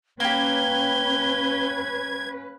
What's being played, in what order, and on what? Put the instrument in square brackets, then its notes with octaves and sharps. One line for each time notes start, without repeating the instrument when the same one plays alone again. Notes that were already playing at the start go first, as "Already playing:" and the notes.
[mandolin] A#3 G4 [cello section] C#4 B4 [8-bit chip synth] G#6 [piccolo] G7